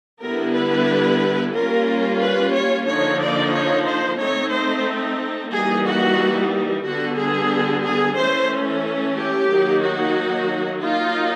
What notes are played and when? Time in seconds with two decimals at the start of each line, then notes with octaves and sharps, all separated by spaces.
0.23 D3 G3 B3 E4 A#4
0.56 B4
1.55 G3 A#3 C#4 F4 A#4
2.22 B4
2.55 C#5
2.87 D3 F3 A#3 D#4 C#5
3.21 D5
3.53 C#5
3.87 C5
4.19 A3 C4 D#4 C#5
4.52 C5
5.52 E3 G3 A#3 D#4 G#4
5.86 F#4
6.84 D3 G3 B3 F#4
7.18 G#4
7.85 G#4
8.17 E3 A3 C#4 C5
9.17 G4
9.50 D#3 F#3 A#3 D#4
9.82 F#4
10.82 F#3 A#3 D#4 F4